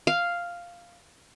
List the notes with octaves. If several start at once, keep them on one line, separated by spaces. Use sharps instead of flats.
F5